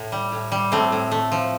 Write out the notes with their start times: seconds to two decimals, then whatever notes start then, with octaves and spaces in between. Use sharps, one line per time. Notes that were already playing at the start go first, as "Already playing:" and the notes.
Already playing: A2
0.12 G3
0.32 A2
0.52 G3
0.72 A2 A3 C4
0.92 A2
1.11 A3
1.32 F3